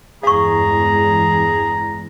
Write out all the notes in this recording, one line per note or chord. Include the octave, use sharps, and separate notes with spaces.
E2 G2 G#3 G#4 F5 A#5 C#6